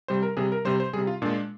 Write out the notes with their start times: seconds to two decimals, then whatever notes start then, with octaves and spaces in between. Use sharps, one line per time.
0.08 C3 G3 C5
0.23 A#4
0.37 C3 G3 G#4
0.52 A#4
0.65 C3 G3 C5
0.80 C5
0.93 C3 G3 G#4
1.07 F4
1.22 A#2 G#3 D4